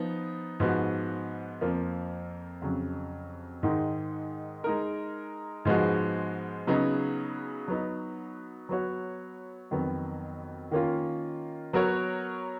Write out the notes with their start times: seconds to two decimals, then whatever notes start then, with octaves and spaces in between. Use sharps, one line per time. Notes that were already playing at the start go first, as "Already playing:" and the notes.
Already playing: F3 B3 D#4
0.60 G#2 F3 B3 F#4
1.61 F2 F3 A#3
2.62 F2 C#3 F#3
3.63 G#2 D#3 G#3 D#4
4.64 G#3 D#4 A#4
5.65 G#2 F3 G#3 B3 F#4
6.67 C#3 F#3 B3 D#4 G#4
7.68 F#3 B3 D#4
8.69 F#3 B3 F#4 C#5
9.71 F2 D#3 F#3 B3
10.71 D#3 A#3 C#4 F4
11.73 F#3 B3 F#4 A#4 C#5